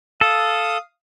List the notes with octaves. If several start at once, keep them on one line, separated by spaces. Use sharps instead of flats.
A4 F5 D#6